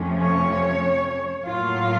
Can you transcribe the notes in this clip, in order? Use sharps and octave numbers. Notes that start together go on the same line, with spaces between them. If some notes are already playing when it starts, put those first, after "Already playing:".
Already playing: F2 C3 F3 A3 C#4
C#5
A2 F#3 A#3 F4